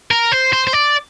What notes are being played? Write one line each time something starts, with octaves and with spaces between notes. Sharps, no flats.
A#4
C5
C5
C5
D5